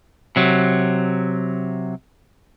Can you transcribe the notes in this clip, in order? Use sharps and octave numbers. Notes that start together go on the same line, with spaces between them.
C3 F#3